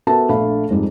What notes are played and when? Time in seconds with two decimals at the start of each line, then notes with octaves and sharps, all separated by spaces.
0.07 B3 F#4 A4 A#4 E5 A5
0.29 A#1 A3 D4 A4 F5 B5
0.70 F2 G#2 G3 G#3 D#4